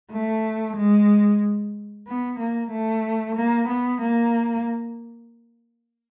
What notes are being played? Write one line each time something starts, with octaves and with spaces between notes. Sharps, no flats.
A3
G#3
B3
A#3
A3
A#3
B3
A#3